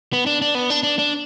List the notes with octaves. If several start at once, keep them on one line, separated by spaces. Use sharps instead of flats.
B3
D4
D4
B3
D4
D4
D4